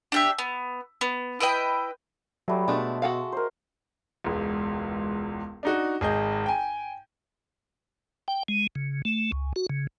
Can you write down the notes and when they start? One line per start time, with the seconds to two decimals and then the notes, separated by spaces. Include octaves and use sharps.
0.12 D4 G4 E5
0.39 B3
1.01 B3
1.40 E4 B4 D#5 G5
2.48 F#3 G3 A3
2.68 B2 G#3 A3 D4 E5
3.02 F#4 A4 F5
3.32 A#4 C5
4.24 E1 C#2
5.63 D4 D#4 F#4
6.01 G#1 G#4 D#5 G6
6.46 G5 G#5
8.28 G5
8.48 G#3
8.75 C#3
9.05 A3
9.32 C#2
9.56 F#4
9.70 C#3